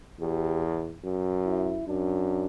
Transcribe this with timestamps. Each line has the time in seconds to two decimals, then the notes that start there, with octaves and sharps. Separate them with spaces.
0.20 E2 G4
1.04 F#2
1.45 E4
1.87 F#2 D4